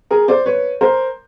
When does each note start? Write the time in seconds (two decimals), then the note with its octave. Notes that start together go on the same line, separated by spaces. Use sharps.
0.11 G#4 A#4
0.28 C5 D5
0.46 B4 C#5
0.81 A#4 C5